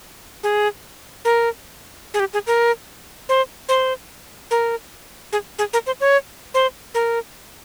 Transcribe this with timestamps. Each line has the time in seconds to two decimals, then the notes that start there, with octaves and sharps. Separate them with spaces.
0.43 G#4
1.25 A#4
2.14 G#4
2.20 G4
2.33 G#4
2.47 A#4
3.29 C5
3.69 C5
4.51 A#4
5.32 G#4
5.58 G#4
5.73 A#4
5.86 C5
6.00 C#5
6.54 C5
6.94 A#4